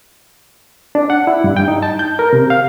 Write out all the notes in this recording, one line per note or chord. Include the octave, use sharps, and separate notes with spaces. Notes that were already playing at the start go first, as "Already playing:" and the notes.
D4
F#5
E4
G2
G5
D#4
A5
G6
A#4
C3
F5